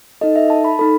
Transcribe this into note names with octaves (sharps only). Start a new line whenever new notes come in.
D#4 A4 D#5
E5
A5
B5
D#4 A4 B5